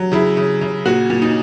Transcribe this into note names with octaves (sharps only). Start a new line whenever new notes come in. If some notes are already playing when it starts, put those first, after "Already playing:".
Already playing: F#3
C#3 E4
C#3
C#3
A#2 F#4
A#2
D#4